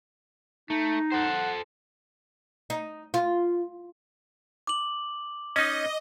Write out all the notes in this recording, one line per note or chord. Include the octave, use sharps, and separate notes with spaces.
A3 D#4
A4 C5 F#5
D#4
F4
D6 F#7
C#4 D#4 D#5